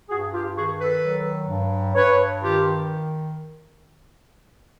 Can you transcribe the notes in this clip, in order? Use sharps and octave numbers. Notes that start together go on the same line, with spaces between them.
G2 F#4 G#4
F4 G4
D#3 F#4 G#4
A4 B4
F#3
G2
G2 B4 C#5
D#3 F4 G4